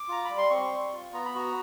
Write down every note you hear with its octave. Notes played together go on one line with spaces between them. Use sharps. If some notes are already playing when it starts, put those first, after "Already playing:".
Already playing: D6
F4 A#5
G3 B5
C6
C4 C#6
G3
F4
B3 A#5
B5
F#4 A#5